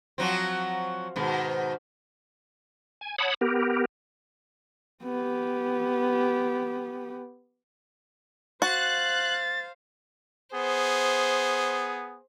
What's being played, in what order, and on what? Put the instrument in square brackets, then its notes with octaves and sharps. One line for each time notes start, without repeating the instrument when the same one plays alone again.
[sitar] F3 F#3 C4
G#2 B2 D#3
[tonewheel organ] G#5
C#5 F#5 A5 B5 D#6
B3 G4 A#4
[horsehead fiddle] B3 G4
[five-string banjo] F#4 [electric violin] C5 F5 [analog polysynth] F#6 [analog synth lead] A6
[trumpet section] B3 G#4 [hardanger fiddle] C5